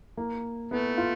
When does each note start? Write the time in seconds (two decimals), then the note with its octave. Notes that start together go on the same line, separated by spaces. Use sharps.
0.17 A#3
0.71 A3 B3
0.98 F4